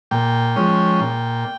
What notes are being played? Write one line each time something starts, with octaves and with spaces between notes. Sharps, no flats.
A#2 G5
F3 G#3 C#4
A#2